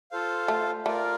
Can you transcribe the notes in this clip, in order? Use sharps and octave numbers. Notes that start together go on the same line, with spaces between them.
F4 A4 C5 F5
A3
A3 F4 A#4 D5